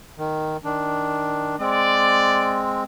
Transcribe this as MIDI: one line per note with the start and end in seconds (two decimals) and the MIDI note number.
0.18 0.57 51
0.64 1.56 51
0.64 1.56 62
1.60 2.84 56
1.60 2.84 60
1.60 2.62 74